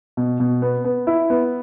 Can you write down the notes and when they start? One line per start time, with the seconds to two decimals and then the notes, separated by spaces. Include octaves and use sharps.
0.17 B2
0.40 B2
0.62 B3
0.84 B3
1.07 E4
1.30 B3